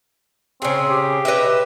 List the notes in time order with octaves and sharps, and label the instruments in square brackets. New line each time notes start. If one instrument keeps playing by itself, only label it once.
[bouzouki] C#3 G#4 [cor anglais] C4
[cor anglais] G4
[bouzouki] B4 D#5 E5